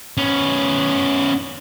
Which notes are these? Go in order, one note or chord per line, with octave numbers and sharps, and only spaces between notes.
B3 C#4